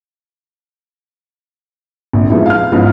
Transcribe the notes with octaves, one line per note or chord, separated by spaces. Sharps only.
A#1 F2
F3 G#3 B3 D#4 E4
F5 F6
G#2 F3 B3 C#4 E4